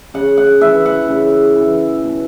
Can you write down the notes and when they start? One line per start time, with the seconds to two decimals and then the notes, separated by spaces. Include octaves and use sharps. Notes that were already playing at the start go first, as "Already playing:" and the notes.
0.14 C#3 F#5
0.38 F#5
0.61 E3 E5
0.86 F#5
1.08 C#3
1.55 E3
2.04 B2